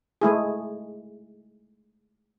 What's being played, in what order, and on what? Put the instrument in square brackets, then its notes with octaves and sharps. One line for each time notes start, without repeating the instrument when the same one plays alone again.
[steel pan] G#3 A3 E4 G#4